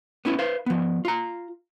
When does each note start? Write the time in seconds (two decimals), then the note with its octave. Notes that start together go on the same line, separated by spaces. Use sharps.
0.25 B3 C#4 E4
0.39 B4 C5 F5
0.66 F3 B3
1.05 F4 A#5